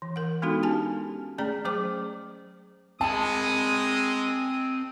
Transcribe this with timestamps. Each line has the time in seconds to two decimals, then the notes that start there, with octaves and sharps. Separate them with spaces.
0.02 E3
0.16 A#4 F#5
0.42 G#3 B3 D4 D#4 F#4 A4
0.63 C#4 G4 G#5 A5
1.38 A3 C#4 G#4 D5 A#5
1.65 F#3 A3 G#4 C5 D6
3.01 G#3 C4 A5 B5 D#6